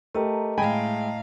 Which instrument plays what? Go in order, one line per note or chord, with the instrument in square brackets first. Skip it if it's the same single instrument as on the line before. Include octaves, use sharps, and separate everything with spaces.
[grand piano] A3 G4 A#4 [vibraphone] D#5 A5 A#5
[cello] A2 F5 [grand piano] G#3 [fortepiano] G5 G#5 B5